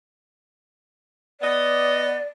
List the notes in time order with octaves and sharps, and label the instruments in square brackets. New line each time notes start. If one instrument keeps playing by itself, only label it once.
[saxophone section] B3 D#5 [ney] D5